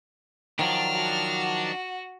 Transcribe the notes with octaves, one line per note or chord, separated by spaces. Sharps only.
D#3 F3 F#3 D4 F6
F#4